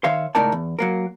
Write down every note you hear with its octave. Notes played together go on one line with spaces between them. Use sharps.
D#3 C#5 E5 F5 C6
C#2 A2 D#4 A#4 D5 A5
E2
F#3 A#3 A#4